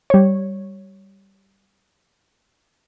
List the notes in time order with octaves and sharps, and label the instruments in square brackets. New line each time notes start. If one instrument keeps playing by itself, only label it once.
[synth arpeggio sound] G3 C#5